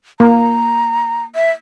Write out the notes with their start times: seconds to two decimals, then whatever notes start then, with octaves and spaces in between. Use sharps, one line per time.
0.20 A#3 A#5
1.35 E5